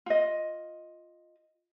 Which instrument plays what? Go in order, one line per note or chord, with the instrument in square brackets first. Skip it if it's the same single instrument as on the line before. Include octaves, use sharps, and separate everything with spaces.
[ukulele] F4 D#5